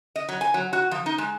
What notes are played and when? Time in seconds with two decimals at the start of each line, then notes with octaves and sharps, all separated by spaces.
0.16 D#5
0.29 F#3
0.41 G#5
0.54 F#3
0.73 F#4
0.91 F3
1.06 D#4
1.18 G#3